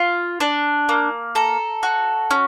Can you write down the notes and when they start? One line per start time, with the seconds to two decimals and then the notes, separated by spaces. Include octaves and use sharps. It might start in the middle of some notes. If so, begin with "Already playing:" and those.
Already playing: F4
0.40 D4
0.89 A#3
1.35 A4 A#5
1.83 F#4
2.31 C#4